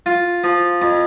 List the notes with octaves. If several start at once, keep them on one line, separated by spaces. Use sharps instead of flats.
F4
F3
F2